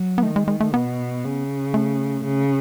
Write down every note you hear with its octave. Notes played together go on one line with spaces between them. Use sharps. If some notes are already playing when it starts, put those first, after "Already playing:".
Already playing: F#3
B3
D#3 A3
G#3
G#3
A3
B2 B3
C#3
A3
C#3